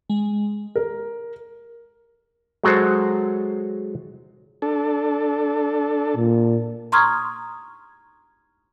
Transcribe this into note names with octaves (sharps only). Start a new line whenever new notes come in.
G#3
A#4
F#3 G#3 F#4 A4 C5
D4 A4
A#2
A#5 C6 C#6 D#6 F6 G#6